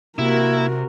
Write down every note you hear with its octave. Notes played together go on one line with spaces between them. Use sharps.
C3 A#3 E4 F#4 A#4